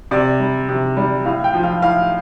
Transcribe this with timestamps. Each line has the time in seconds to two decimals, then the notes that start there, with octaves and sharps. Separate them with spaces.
0.11 C3 D5
0.40 G3
0.69 C3
0.97 G3
1.25 A2 F5
1.44 G5
1.54 F3
1.63 F5
1.82 A2 F5